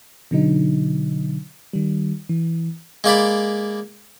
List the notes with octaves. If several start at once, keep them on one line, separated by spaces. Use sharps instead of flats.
B2 D3 F#3 D#4
D#3 G3
E3
G#3 A#3 D5 B5